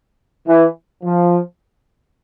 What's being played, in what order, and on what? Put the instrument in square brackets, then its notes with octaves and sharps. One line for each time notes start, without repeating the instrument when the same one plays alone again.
[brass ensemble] E3
F3